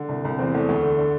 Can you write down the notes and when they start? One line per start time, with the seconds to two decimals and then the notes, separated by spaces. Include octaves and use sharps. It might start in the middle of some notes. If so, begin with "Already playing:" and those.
Already playing: D3
0.09 C2
0.25 C2
0.38 E2 C4
0.54 E2 A3
0.69 D2 A3
0.83 D3
0.99 D3